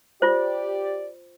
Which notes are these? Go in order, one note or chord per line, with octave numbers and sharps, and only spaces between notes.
F4 G4 C5 D5